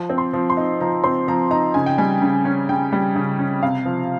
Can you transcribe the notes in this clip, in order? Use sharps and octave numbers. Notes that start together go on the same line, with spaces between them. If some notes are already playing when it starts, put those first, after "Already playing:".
Already playing: F3
C4
C6
F3
C6
D#4
F3 A#5
C4 C6
F3 A#5
D#4 A#5
C#3 G#5
G5
G3 G#5
C#3
C#4
C#3 G5
G3
C#3
C#4
C3 F5
F3